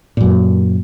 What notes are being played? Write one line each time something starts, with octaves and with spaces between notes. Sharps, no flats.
F#2 A#2